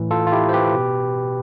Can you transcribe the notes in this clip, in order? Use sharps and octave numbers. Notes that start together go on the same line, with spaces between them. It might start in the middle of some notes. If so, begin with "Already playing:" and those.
Already playing: A2 E3
F4 A4
F4
E4 G4
C5
G4 B4
B2